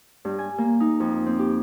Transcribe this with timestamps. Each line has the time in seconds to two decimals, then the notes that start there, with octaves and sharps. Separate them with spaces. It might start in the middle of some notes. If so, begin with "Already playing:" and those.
0.25 G2
0.38 G#5
0.58 A#3
0.80 D#4
1.00 F2
1.26 C4
1.39 G4